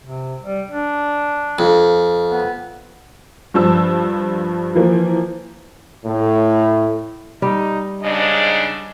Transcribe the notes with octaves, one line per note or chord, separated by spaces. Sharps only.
C3
G3
D4
F2
B3
G2 F3 A5 E6
E3 F3 A#3
A2
G3 D#4
G#2 C#3 D4 D#5